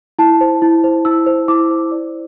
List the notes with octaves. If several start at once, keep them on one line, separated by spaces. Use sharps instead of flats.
E4 A5
C5
E4
C5
E4 E6
C5
E4 D6
C5
D5